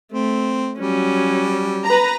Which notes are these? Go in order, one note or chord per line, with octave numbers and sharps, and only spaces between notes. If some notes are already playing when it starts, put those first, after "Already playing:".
A3 C4
F#3 G3 C#4
B4 A#5